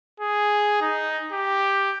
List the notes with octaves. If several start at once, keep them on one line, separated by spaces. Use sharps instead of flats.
G#4
D#4
G4